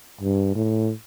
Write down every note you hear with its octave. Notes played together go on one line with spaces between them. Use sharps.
G2
A2